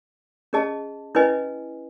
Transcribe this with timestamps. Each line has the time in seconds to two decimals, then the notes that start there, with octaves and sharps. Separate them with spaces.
0.53 C#4 G#4 D#5 A5
1.15 C#4 E4 B4 D#5 G#5